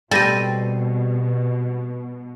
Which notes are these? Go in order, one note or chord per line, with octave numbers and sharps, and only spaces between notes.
B2 G3 C4 G4 A4 A6 A#6 D#7